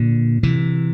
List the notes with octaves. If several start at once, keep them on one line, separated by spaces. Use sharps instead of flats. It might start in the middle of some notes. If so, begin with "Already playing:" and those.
Already playing: A#2 D3
C3 E3